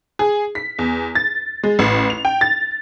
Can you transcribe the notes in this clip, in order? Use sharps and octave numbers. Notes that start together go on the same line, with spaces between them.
G#4
B6
E2
A6
G#3
A1
F7
G5
A6